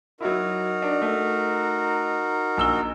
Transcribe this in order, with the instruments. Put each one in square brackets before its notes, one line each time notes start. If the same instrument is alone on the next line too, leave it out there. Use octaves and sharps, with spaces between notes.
[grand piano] F#3 E4 [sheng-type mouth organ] D#4 F#4 A#4
[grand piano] D4
A3
A#1 E6 G7